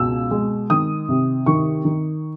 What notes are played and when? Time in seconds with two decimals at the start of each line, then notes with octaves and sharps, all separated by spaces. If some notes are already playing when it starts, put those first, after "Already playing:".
Already playing: C#2 B2 E6
0.31 G#3
0.70 D#3 D#6
1.09 C3
1.46 D#3 C#6
1.85 D#3